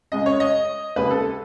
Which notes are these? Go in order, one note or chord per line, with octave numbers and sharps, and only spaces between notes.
C#2 C#3 G#3 D#5
C#5
D#5
D#2 C#3 G#3 B4
A4